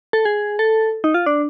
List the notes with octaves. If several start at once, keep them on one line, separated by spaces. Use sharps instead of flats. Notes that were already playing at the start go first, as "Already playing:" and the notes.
A4
G#4
A4
D#4
F4
D4